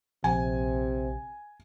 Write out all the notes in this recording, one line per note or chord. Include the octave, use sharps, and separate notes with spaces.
A#1 C3 G#5